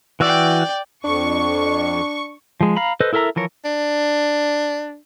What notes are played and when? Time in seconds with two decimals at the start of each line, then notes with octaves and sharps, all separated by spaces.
0.20 E3 F#4 D5 G5 E6
1.04 F2 D4 C#6
2.61 F3 G#3
2.76 F5 A#5 B5
3.00 A4 B4 C5 D#5
3.13 E4 A4 A#4 E5 A#5
3.36 E3 F3 A#4 C#5
3.65 D4